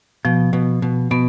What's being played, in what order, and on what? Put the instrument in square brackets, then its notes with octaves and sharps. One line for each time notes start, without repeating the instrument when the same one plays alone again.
[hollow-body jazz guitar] B2 [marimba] F3
[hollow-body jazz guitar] B2
B2
[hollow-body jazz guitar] B2 [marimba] B3